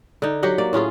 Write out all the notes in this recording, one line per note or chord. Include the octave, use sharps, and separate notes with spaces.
D3 D#4
F#3 G4 D#5 F#5
A#3 D5
A2 C#4 F4 G#4